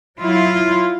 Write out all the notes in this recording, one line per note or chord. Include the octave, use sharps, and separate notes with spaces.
F#3 E4 F4